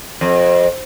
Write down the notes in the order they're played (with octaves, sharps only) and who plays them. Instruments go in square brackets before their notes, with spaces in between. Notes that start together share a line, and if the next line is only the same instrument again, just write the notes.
[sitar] F2